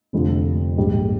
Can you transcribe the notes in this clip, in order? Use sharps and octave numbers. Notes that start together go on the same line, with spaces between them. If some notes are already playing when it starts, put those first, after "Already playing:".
F1 F2 D3 F3
A#1 G#2 G3